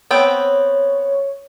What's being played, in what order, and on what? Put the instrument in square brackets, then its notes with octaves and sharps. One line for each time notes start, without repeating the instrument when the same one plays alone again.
[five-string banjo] B3 C4 G5 [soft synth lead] C#5